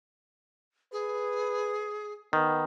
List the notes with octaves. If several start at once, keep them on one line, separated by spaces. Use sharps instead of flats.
G#4 B4
D#3 B3